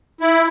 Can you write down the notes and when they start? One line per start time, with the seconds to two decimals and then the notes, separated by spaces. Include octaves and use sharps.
0.21 E4